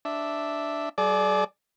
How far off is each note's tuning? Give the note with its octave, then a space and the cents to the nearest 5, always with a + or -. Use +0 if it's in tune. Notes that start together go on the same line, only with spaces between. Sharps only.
D4 +0 E5 +0
G3 -45 G#4 +45 D5 +5